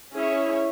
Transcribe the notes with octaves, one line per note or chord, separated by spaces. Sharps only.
C#4 E4 G#4 C#5